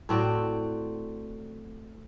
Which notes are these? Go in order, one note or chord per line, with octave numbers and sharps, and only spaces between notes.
A2 C4 F#4 D5